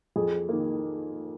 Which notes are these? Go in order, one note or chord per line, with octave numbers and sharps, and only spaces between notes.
F2 G#4
D#3 A#3